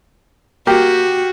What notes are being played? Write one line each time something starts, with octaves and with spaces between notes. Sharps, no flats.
A#3 F#4 G4